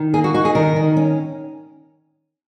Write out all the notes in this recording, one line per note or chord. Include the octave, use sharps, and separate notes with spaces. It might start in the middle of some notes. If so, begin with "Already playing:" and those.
Already playing: D#3
A#3 G#4
F#4
D#4 F#4
G#4
D#3 A#4
D#3
C#4